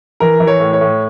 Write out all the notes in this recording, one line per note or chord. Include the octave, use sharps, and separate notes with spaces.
E3 A#4
E3
C#5
A2
C#5
A2